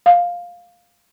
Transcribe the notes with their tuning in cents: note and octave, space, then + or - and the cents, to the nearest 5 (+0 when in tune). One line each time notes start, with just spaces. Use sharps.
F5 +10